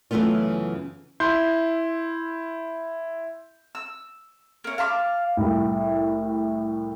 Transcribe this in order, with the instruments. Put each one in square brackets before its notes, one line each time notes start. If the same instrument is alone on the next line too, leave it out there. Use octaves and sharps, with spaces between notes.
[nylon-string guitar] F#2 C#3 E3 A3 B3 F4
[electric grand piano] E4 C6 G6
[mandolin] E6
A#3 C#4
F5 A5 B5 D6
[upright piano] C2 A2